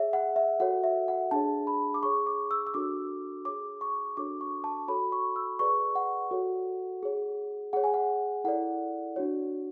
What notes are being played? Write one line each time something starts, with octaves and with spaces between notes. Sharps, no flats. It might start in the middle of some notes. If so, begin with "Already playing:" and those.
Already playing: G#4 C#5 E5
F#5
E5
F#4 A4 C#5 F#5
E5
F#5
D4 G#4 C#5 A5
B5
D6
G#4 C#5 C#6
D6
E6
E6
D4 F#4 A4 D6
G#4 C#5 D6
C#6
D4 F#4 A4 C#5 D6
C#6
A5
F#4 A4 C#5 B5
C#6
E6
G#4 B4 D5 C#6
F#5
F#4 A4 C#5
G#4 C#5
G#4 C#5 F#5
G#5
F#5
E4 A4 D5 F#5
D4 F#4 C#5